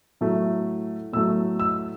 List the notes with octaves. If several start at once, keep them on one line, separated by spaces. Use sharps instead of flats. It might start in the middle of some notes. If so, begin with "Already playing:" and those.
A2 F#3 A3
A2 F#3 A3 E6
E6